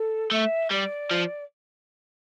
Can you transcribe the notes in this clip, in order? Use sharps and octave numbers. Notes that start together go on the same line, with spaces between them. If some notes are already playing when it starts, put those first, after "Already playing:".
Already playing: A4
A3 E5
G3 D5
F3